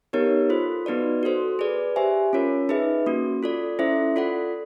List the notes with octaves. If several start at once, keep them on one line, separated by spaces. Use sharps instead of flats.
B3 D#4 G4 A#4 C#5
F4 A4 C5
B3 D#4 F#4 B4 D5
F#4 A4 C5
G#4 B4 D5
G4 C5 E5 G#5
C#4 F4 A#4 C#5
D#4 G#4 B4 E5
A#3 C#4 F#4
F4 A4 D5
C#4 E4 A4 C5 E5
F4 A4 D5 F#5